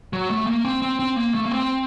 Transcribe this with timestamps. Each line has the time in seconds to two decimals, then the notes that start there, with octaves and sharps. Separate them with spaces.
0.13 F#3
0.30 A3
0.47 A#3
0.65 C4
0.82 C4
0.99 C4
1.16 A#3
1.35 A3
1.46 A#3
1.51 C4